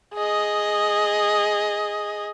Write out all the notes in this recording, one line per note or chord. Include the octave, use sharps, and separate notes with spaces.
G#4 D#5